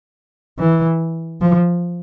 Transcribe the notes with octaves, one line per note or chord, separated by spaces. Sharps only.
E3
F3